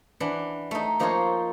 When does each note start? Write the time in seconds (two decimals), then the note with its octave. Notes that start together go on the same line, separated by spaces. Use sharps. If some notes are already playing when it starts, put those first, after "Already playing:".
0.20 E3 D4 F#5
0.71 A3 D#4
1.00 F3 A#3 D#4 F4 C5 C#5